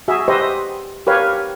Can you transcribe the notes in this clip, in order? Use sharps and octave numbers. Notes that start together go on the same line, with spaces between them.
F#4 G#4 E5
G4 B4 C5 D#5 E5
G4 A#4 B4 C#5 F5